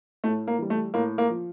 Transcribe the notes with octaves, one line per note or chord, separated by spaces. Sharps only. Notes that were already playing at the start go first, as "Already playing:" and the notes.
A2 A3
A#3
E3 G3
A3
A2 A#3
A#3
F3